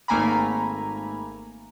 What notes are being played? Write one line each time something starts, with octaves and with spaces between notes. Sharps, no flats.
G#1 A3 A#3 G#5 A#5 B5